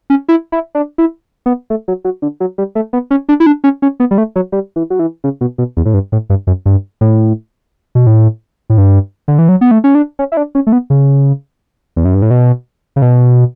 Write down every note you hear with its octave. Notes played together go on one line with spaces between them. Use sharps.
C#4
E4
E4
D4
E4
B3
A3
F#3
F#3
D3
F#3
G3
A3
B3
C#4
D4
E4
D4
C#4
C#4
B3
G3
A3
F#3
G3
E3
F#3
E3
C#3
B2
B2
E2
A2
G2
A2
G2
F#2
G2
A2
B2
A2
A2
G2
D3
E3
F#3
B3
A3
C#4
D4
C#4
E4
D4
C#4
A3
B3
C#3
E2
F#2
G2
A2
B2
C#3
B2